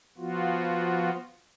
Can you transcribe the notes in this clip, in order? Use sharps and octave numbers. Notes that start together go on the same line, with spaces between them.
F3 B3 F4 F#4